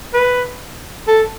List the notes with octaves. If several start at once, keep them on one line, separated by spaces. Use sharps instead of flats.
B4
A4